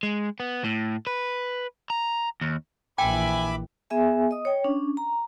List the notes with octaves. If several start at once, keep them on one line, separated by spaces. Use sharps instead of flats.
G#3
B3
A2
B4
A#5
D#2
A#1 E3 E5 G5 G#5 B5 D6
B3 G#4 E5 G#5
D#5 D#6
C#5 G5
C#4 D4
A#5